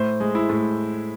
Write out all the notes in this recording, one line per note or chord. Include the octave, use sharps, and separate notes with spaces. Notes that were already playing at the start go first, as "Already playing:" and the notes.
Already playing: A2 C5
G#3
E4
A2